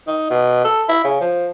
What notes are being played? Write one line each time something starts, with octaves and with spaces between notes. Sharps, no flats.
D#4
B2
A4
E4
C#3
F3